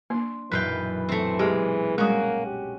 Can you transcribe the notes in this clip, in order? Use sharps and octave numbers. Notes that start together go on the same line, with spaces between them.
A#3 D4 C6
B1 F#2 A#2 E3 B4 F5 G5
A3 C4
G#3 G4 G#4 D6 F6 D7
G3 G#3 A#3 C#4 F#4
G4